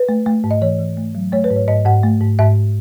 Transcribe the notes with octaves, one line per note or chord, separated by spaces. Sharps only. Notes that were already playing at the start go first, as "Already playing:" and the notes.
Already playing: B4
A3
A3
G#2
D#5
E3 C#5
E3
A3
F#3
A3 C#5
B4
G#2
C#5
G#2 D#5
G#2 F#5
A3
G#2
G#2 E5